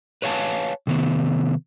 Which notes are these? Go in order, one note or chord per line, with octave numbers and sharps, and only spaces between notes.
B4 C#5 F5 G#5 A5
C3 D#3 B3